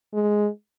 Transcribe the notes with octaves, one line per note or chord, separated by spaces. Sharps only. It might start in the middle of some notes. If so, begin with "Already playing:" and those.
G#3